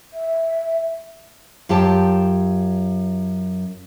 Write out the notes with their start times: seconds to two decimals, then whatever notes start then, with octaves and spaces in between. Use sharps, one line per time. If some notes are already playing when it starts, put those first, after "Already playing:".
0.13 E5
1.69 F#2 F4 G4 A5